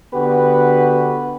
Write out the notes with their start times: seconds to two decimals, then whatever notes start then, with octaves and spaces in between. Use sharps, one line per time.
0.14 D3 B3 F#4 G4 B4